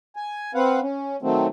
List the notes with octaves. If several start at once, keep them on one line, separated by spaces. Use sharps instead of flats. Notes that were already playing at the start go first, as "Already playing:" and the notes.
G#5
C4 B4 F5 F#5
C#4
D#3 F#3 A3 C4